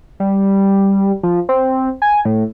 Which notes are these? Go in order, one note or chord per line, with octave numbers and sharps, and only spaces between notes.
G3
F3
C4
G#5
A2